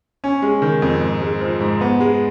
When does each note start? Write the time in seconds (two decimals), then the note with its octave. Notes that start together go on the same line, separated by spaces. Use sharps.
0.24 C#4
0.42 G#3
0.62 D#3
0.82 F2
1.01 G#2
1.22 G#3
1.41 F3
1.60 G#2
1.81 B3
2.00 G#3